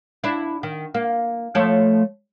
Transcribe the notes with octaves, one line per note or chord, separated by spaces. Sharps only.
D4 E4
D#3
A#3
F3 A3 C#5